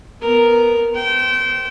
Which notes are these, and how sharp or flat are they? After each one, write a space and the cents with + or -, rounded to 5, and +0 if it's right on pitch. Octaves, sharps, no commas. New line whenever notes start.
B3 +0 A#4 +0
C5 +10 G5 -30